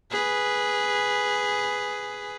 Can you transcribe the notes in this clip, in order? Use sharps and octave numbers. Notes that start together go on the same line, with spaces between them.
G#4 B4